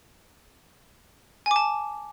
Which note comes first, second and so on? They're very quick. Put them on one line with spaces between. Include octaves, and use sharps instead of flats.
G#5 D6 A5